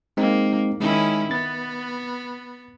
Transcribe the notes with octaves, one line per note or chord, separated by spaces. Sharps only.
G#3 A#3 C4 D#4
D#3 G#3 C#4 D#4 E4
B3 A6